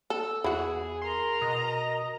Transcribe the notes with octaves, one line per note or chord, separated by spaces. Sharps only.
A4 E6
E2 E4 F#4 G#4
A#4 A#5 C6
B2 D#5